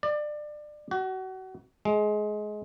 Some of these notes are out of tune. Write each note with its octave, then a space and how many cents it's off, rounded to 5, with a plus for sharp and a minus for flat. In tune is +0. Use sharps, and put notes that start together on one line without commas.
D5 +25
F#4 +30
G#3 +20